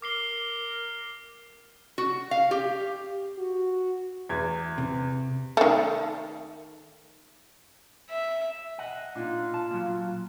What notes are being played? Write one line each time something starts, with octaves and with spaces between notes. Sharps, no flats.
A#4 D6 C7 G7
F#4
F5
G4
F#4
E2 G#6
C3
D#3 A3
E5
D#5 F#5
A#2 D4 D#4 F4
A5
A#2 F#3